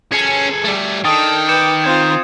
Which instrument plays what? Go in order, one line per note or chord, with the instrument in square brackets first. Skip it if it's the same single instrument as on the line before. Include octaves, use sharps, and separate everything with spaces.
[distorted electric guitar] C#4 [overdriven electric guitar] G#4 A4 [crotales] G#6
[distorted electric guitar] G3 A3
[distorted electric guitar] D#3 [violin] D4 A4 [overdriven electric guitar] G5 [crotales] D#6 A6
[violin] B4 D6 [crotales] G6 C#7 E7
[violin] C4 F4 [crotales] G#6